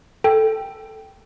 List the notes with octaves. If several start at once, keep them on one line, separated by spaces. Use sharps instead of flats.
A4 G5